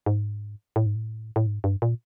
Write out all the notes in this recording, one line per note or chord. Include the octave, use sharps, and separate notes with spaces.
G#2
A2
G#2
A2
A2
G#2
G2
A#2